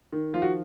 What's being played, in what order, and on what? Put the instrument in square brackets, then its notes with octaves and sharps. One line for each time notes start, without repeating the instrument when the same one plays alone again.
[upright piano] D#3
F3 F4
F#4